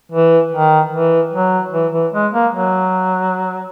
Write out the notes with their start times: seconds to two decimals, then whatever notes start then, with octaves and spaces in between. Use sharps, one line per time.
0.11 E3
0.52 D#3
0.92 E3
1.32 F#3
1.73 E3
1.93 E3
2.13 G#3
2.33 A#3
2.53 F#3